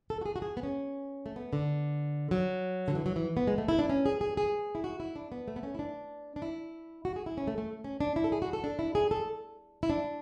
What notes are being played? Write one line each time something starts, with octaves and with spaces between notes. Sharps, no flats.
A4
F#4
G#4
F#4
G#4
B3
C#4
A3
B3
D3
F#3
D3
E3
F#3
E3
B3
G#3
A3
E4
D4
C#4
G#4
G#4
G#4
E4
F#4
E4
D4
B3
A3
B3
C#4
E4
D4
D4
E4
F#4
G#4
E4
C#4
A3
A3
C#4
D4
E4
A4
G#4
F#4
A4
D4
E4
G#4
A4
E4
D4